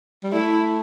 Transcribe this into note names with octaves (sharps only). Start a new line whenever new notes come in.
G3
A3 E4